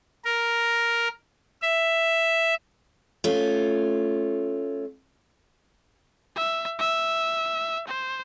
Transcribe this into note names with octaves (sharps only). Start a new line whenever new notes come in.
A#4
E5
A3 C#4 F4
E5
E5
C5